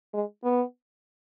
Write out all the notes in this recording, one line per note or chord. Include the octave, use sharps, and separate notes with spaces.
G#3
B3